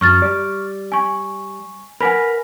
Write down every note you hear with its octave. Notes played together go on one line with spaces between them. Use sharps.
F#2 F#3 C#6 F6 A6
G3 D5
G#5 C#6
A#4 B4 F#5 G#5 B5